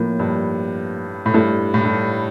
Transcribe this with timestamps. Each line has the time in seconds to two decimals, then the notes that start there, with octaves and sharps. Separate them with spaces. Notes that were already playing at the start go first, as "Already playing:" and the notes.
Already playing: A2 F3 A#3 F4 A#4
0.19 G2
1.26 A2
1.34 G2 A3 E4 A4
1.74 A2
1.85 G2